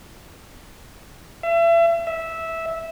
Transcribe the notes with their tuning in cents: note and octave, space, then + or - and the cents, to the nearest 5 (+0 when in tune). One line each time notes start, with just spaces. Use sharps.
E5 +35
E5 -10